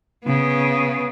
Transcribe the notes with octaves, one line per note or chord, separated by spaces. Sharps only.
C#3 B3